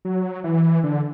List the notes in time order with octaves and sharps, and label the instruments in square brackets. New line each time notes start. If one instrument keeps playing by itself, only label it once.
[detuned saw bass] F#3
E3
D3